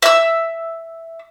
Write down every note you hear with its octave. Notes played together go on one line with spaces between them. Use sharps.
E5 E6